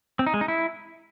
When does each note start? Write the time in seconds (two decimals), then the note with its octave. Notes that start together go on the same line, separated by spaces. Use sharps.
0.19 C4
0.27 D#4
0.34 G#3
0.41 D#4
0.48 E4